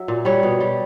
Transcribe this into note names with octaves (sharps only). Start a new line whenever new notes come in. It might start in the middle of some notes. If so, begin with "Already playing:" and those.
Already playing: F#3 E5
A#2
G3 C#5
B2
G3